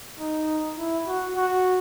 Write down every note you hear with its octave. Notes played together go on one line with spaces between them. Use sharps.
D#4
E4
F#4
F#4